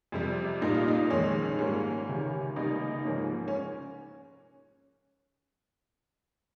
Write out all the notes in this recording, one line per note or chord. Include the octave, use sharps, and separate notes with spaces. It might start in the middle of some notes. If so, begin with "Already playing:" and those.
F2 C3 G3
A#2 G3 A#3 D#4
F4
D#4
F2 D#3 G#3 C#4
G#2 G3 A#3 C#4
C#2 C3 D#3
C#2 C3 G3 A#3 D#4
G#2 F3 A#3 C#4
C#4